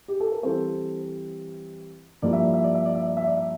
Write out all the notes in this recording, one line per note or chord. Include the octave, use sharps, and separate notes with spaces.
G4
A4
A#4
E3 G3 C4 A4 C5
G2 F3 A#3 E4 D5
E5
D5
E5
D5
E5
D5
E5
D5
E5
D5
E5